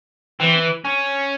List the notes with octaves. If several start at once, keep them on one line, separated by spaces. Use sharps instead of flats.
E3 C4
C#4